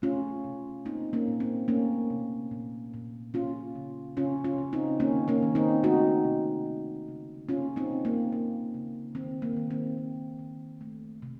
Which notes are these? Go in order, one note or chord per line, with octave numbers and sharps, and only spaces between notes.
A3 C#4 F4
C3
A#3 C4 D#4
A#3 C#4
A#2
C4
A3 A#3 C#4
C3
A#2
A#2
A#3 C#4 F4
C#3
C#3 C#4 F4
C#4 F4
C#3
C4 D#4
D#3 A#3 C#4
A#3 C#4
D#3
C4 D#4
A3 D#4 F#4
C3
A#3
C#3
A#3 C#4 F4
C4 D#4
C3
A#3
A#3
C#3
D#3 C4
A#3
D#3
C4
A#3
D#3
A3
C3